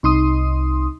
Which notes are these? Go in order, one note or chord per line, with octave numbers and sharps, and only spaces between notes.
C2 D#4 C6 D#6